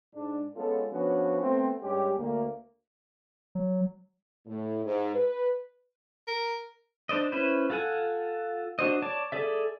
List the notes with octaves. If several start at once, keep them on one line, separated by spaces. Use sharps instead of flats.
G#2 D4
G#3 B3 C#4 F4 A4
F3 B3 C#4 D4 F#4 B4
A3 B3 C4
G2 G#3 C#4 G4
D2 A#3
F#3
A2
G#2
B4
A#4
D4 C5 D5 D#5
C#4 E4 B4 C5
F4 A4 F#5 G#5
D4 F#4 C5 D#5
C#5 D5 A5 D6
G#4 A4 D5 E5